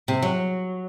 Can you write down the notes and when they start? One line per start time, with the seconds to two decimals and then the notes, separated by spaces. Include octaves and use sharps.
0.08 C3
0.22 F#3